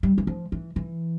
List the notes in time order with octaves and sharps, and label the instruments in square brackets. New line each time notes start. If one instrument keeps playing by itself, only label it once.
[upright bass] G3
E3
F3
E3
E3